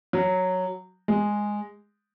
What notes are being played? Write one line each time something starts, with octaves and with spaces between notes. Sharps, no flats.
F#3
G#3